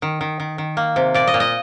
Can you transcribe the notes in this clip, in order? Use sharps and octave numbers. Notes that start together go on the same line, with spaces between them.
D#3
D#3
D#3
D#3
A#3
C3
A#2 D5
D#5
A#2
D#5